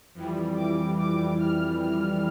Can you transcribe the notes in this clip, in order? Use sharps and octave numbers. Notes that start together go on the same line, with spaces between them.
F2 E3 G3
D6
D6
F6
F6